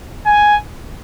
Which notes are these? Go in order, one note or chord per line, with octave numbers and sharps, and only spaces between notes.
G#5